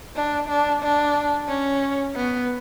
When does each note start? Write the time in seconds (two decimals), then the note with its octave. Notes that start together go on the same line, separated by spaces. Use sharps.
0.16 D4
0.49 D4
0.82 D4
1.48 C#4
2.16 B3